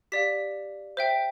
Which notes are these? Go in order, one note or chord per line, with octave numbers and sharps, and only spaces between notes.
G4 D5 F5 B6
C5 E5 G5